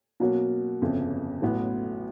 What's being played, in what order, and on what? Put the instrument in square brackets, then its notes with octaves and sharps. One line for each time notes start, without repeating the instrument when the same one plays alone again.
[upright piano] B2 F#3 A#3 C#4 F#4
G1 F2 C#3
A1 A2 F#3 B3